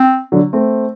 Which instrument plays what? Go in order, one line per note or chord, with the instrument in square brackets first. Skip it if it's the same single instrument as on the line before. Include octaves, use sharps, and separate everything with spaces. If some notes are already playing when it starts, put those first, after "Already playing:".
Already playing: [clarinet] C4
[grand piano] D3 F#3
A3 C4